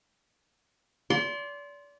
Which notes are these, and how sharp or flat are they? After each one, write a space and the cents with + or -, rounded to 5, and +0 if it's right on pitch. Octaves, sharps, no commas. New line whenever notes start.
D5 -35 C6 +0